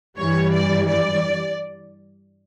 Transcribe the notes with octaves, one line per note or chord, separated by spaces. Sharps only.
G2 E3 G3 C#5
D5
D5